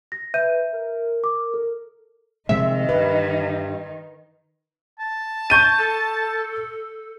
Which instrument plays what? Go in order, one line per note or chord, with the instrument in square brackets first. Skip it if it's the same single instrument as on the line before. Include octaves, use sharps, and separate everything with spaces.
[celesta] A#6
[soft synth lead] B4 [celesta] E5 G6 D#7
[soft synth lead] A#4
[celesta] D6
A4
[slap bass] C3 F3 G#3 [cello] D#3 D#4 [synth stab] E5
[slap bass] G2 [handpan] B4
[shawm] A5
[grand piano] C#6 G6 D#7
[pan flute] A4